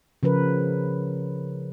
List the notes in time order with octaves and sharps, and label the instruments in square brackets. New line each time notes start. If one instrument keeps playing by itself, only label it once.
[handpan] C#3 F3 A#4 B4